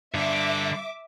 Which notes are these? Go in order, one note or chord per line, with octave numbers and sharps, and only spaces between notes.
G2 D3 E5 D6